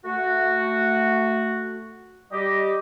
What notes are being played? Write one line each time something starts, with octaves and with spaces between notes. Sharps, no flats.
A3 F#4
G3 G4 D#5